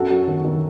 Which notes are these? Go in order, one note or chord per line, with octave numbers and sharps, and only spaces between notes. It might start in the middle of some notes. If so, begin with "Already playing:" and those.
Already playing: F#2 F#4 A4
F#3
D#3
D#3